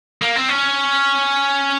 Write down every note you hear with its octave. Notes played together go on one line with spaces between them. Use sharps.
A#3
C4
C#4